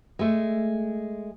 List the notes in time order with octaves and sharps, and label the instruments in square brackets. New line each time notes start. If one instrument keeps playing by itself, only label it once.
[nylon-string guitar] G#3 A3